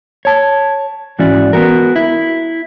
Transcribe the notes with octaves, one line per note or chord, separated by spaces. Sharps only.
C#5 A5
G#2 E3 C#4 E4 F#4 D5
B3 F#4 A#4
E4